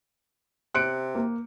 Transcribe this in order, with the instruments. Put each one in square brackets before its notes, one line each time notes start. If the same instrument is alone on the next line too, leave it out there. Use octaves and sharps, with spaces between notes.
[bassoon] C3 [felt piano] F#6 C#7 D7
[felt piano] A#3